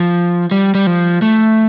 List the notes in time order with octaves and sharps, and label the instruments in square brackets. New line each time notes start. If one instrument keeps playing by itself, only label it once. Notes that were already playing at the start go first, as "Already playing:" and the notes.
Already playing: [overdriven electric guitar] F3
G3
G3
F3
A3